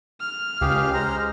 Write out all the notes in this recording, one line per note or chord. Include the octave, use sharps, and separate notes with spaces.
F6
C#2 G4 G#4 F5
G#3 C5 A#5